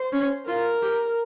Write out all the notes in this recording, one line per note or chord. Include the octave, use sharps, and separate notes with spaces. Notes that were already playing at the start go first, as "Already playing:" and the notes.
Already playing: C5
C#4
F4 A#4
G4